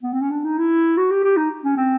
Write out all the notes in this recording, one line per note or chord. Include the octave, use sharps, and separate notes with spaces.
B3
C4
C#4
D4
D#4
E4
F#4
G4
G4
D#4
C#4
C4